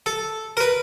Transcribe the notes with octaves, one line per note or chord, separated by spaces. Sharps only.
A4
A#4
B4